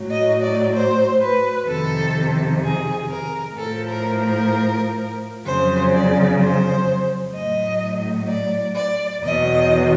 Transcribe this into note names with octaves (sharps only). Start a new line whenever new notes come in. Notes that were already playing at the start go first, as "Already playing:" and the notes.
Already playing: A2 F#3
D#5
D5
C5
B4
F2 C3 D#3 A4
G#4
A#4
A2 F3 A4
A#4
A#4
F2 C#3 F#3 C5
D5
C5
A2 F#3 D#5
D5
D5
E2 B2 F#3 D#5